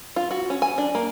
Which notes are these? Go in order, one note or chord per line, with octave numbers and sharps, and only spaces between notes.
F4
F#4
C#4
G#5
D4
A#3